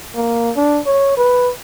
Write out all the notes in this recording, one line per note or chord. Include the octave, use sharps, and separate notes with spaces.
A#3
D4
C#5
B4